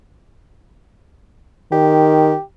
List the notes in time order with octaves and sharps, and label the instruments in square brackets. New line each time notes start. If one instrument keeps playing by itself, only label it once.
[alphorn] D#3 [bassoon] G4